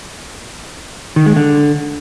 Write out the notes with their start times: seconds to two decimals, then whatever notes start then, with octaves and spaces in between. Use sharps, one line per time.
1.16 D#3
1.26 G#3
1.36 D3